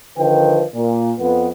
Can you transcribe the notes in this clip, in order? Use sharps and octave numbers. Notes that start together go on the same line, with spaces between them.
D3 D#3 F3 B4 G5
A#2
F2 B3